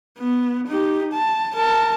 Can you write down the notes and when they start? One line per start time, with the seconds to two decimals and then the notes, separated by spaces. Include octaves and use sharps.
0.19 B3
0.67 D#4 G4
1.12 A5
1.55 A#4 A5